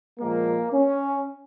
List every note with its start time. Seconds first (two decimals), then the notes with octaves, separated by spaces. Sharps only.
0.19 A#2 F3 G#3 A#3
0.73 C#4